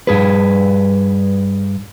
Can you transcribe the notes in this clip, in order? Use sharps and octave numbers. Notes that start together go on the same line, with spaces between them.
G2 G#4 B4